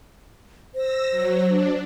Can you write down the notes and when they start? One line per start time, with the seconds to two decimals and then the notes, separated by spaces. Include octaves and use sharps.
0.75 C5 E6 A#6
1.10 F#3
1.47 D4